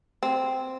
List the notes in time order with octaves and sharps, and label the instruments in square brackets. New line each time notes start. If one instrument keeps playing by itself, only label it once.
[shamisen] C4